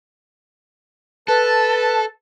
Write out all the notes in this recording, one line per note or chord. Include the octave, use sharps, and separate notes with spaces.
A4 B4 A5